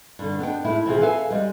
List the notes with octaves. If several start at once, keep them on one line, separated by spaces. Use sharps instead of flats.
G2 D3
B3 D4 D#4 G5
A2 G#3 E4
C3 E3 F4 G#4
A4 B4 E5 F5 G#5
G3 G#3